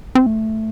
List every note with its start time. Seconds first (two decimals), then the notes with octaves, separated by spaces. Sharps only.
0.15 C4
0.26 A3